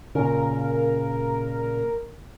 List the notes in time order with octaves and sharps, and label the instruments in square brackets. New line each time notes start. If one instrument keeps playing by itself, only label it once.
[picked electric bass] A#2 C#3 [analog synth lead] A#4